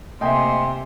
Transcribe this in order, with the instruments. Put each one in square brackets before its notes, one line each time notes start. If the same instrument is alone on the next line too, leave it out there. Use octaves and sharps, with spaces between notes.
[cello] C3 [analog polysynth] A3 A#3 E5 [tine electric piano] D#5 G5 G#5 [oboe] C6